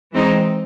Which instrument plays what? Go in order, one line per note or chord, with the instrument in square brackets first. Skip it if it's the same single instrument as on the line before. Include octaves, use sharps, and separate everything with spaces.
[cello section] E3 G#3 C4 D#4